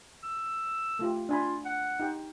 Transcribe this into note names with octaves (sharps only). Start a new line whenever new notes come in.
E6
A3 F4 G4
D4 F4 G#5 B5
F#5
D#4 G4 G5